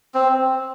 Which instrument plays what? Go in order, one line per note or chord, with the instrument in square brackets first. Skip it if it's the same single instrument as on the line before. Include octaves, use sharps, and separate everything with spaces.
[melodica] C4